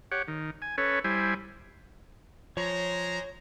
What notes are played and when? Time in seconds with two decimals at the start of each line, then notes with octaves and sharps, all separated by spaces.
0.12 G4 C#5 F#5
0.28 D#3
0.62 G#5
0.78 C#4 A4 B4 C#5
1.04 G3 E4 C5 G#5
2.57 F3 G#3 C5 C#5 A#5